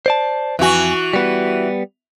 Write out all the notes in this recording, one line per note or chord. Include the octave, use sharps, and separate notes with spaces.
C5 D5 A5
F2 E3 F#4 G#5
G3 B3